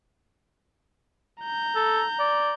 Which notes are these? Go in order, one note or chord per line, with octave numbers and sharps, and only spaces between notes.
A#5 G6
A4
D5